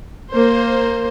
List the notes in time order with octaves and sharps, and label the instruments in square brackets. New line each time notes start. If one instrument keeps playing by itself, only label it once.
[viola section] A#3 C5